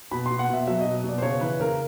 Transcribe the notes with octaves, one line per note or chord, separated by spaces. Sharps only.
B2 B5
B2 C6
F#5
B2 E5
F#3 E5
B2 D#5
B2 D5
C5
C#3 C#5
E3 B4
C#3 A#4